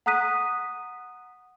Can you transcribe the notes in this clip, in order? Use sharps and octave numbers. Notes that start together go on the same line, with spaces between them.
F#5 A#5 D#6 F#6 B6 D#7